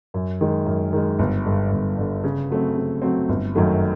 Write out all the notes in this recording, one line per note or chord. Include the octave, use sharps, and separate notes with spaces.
F#2
D#3 G#3
F#2
D#3 G#3
G1
G2 D3
G1
G2 D3
C#3
F#3 A3 C4
C#3
F#3 A3 C4
G1
F#2 D#3 F#3 A3